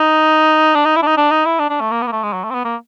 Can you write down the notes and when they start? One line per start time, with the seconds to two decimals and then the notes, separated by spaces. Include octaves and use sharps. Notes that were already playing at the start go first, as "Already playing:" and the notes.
Already playing: D#4
0.75 D4
0.85 D#4
0.96 E4
1.03 D4
1.06 D#4
1.17 D4
1.31 D#4
1.45 E4
1.59 D4
1.70 D4
1.80 A3
1.91 A#3
2.02 B3
2.07 A#3
2.12 A3
2.23 G#3
2.33 F#3
2.44 A3
2.50 C4
2.54 B3
2.65 A#3